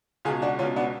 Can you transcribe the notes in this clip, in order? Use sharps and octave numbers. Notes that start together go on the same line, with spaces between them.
C#2 B2 F4 G#4
D4 F#4
C#2 B2 C#4 F4
B3 D4